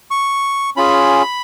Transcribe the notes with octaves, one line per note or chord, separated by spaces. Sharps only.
C#6
C#4 F4 G#4 B5